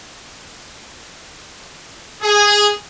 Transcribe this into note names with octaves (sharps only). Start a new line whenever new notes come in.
G#4